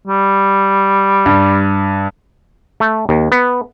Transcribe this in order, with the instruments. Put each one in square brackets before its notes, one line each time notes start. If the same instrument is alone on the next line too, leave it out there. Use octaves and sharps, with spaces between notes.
[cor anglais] G3
[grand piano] G2
[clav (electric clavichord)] A3
D#2
B3